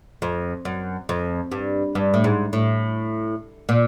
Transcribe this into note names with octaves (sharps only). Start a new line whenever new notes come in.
F2
F#2
F2
G2
G2
A2
G#2
A2
A#2